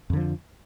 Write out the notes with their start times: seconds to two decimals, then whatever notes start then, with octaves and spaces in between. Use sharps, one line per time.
0.10 F2
0.13 D3
0.17 F3